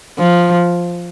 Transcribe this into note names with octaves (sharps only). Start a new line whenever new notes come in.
F3